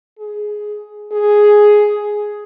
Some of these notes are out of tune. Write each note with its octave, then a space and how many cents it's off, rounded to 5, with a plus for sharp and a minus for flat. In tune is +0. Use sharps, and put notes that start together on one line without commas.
G#4 +10
G#4 +5